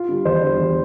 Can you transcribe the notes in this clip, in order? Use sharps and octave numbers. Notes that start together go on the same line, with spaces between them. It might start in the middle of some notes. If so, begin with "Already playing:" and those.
Already playing: F4
D3 G3
E2 C5
D3 G3
E2